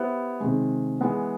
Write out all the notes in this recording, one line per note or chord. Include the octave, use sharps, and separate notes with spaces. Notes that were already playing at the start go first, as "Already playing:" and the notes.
Already playing: B3 E4 G4 C5
C3 D#3 G#3
E3 G#3 B3